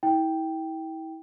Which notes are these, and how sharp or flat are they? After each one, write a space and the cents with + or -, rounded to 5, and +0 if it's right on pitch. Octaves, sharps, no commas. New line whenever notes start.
E4 -35 G5 +0